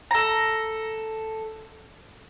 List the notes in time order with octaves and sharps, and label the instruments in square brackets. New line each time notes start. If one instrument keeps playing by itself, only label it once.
[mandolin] A4 A#5